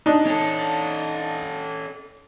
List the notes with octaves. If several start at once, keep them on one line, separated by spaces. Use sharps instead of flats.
D4 D#4
C#4 A4